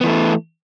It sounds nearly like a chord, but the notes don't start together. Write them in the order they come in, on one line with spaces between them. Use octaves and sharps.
B3 E3 A3